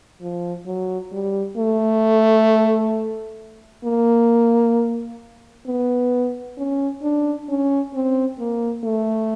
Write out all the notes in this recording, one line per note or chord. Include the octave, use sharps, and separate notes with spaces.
F3
F#3
G3
A3
A#3
B3
C#4
D4
C#4
C4
A#3
A3